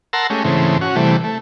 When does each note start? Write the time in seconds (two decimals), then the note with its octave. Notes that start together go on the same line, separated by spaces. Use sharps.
0.13 A#4 F#5 A5 A#5 C6 E6
0.30 G#3 A3 C#4 G4
0.44 G#2 C#3 E3 A3 C4
0.81 C#4 F#4
0.96 C3 E3 G3 A3
1.24 A3